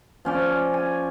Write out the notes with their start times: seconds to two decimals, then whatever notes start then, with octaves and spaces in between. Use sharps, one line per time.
0.25 F3 C#4 D5
0.74 G#5